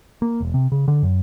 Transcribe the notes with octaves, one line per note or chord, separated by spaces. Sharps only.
A#3
E1
C3
C#3
D3
F#2